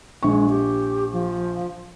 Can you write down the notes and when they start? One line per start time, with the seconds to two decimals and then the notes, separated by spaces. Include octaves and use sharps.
0.23 A#1 G#3 C#6
0.49 G4
1.13 F3